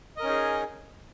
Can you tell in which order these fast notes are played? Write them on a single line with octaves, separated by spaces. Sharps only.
D#5 A#4 C#4 D#4 G#4